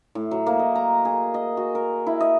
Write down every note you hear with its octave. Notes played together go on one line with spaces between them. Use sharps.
A2
F#3
A#3
D#5
A#5
G#4
D#5
F#4
A#4
E4
D#5